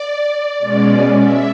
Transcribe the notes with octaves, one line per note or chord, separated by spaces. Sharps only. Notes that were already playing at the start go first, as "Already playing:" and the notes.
Already playing: D5
B2 G#3 C#4
E5